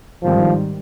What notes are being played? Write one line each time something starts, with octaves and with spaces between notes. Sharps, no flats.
G#2 D#3 F3 G3 C4